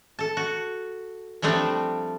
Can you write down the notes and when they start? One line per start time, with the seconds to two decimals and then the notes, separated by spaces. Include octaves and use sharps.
0.19 A4 A5
0.37 F#4
1.42 F3 G3 A3 C4 D4